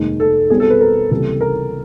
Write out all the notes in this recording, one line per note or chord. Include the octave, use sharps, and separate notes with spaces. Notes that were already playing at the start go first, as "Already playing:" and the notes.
Already playing: F1 D#2 D#3 G#3
A4
B1 B2 G3 C4 G#4
A4
B4
A#4
C#2 C3 E3 G3 A#3 A4
A#4